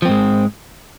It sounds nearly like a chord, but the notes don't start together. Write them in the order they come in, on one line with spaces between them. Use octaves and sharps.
F3 C4 G#2 G#3